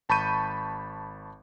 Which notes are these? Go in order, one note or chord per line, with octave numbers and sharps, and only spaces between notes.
G#1 A5 B5 C#6 G6 D#7